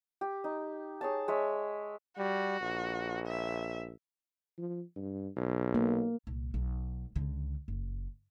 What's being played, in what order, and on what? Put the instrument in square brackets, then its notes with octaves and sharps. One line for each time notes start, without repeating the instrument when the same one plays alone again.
[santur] G4
D#4
G#4 C#5 A5
G#3 C#5 E5
[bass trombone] G3 [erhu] F#4
[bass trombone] A#1
[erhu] E5
[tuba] F3
G2
B1
[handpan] A#3
[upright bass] C2 A#2
B1
C#2 D3
F#1